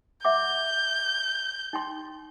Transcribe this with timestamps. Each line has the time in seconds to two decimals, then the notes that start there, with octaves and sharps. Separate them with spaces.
0.25 E5 F#5 D6 G6
1.73 D#4 G5 C6